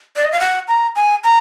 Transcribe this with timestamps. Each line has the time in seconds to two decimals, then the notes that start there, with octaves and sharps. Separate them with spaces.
0.16 D5
0.24 D#5
0.32 F5
0.40 F#5
0.68 A#5
0.96 G#5
1.24 A#5